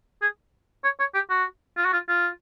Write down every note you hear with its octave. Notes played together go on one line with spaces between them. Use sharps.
G#4
C#5
C#5
G4
F#4
F4
F#4
F4
F4